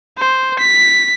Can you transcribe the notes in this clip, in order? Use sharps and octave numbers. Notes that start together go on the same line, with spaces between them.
C5
B6